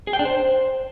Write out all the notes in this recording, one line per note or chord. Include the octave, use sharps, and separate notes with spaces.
G#4
G5
D4
C5